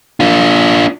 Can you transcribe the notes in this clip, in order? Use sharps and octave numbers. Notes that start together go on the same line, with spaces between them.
D4 F4